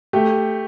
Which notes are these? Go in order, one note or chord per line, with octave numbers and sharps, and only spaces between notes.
A3 G4